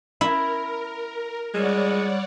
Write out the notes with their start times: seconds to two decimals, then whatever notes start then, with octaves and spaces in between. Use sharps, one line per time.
0.21 E4 A#4
1.54 G3 G#3 C#5 D5 F#5